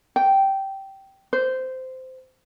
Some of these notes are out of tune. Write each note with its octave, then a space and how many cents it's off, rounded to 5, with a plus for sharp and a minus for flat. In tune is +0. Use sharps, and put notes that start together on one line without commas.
G5 -15
C5 -15